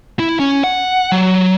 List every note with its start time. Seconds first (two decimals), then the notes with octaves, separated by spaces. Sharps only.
0.19 E4
0.40 C#4
0.64 F#5
1.12 F#3